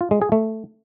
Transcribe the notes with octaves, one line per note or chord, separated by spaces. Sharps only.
F4
G#3
G#4
A3